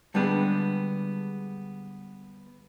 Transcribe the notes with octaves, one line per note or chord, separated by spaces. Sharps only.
D3 G3 G#3 B3 D4